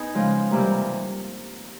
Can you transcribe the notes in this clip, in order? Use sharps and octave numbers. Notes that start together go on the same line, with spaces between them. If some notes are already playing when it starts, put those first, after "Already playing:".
Already playing: B3 D#4 G#4
C#3 F3 G#3
C3 E3 G3 A#3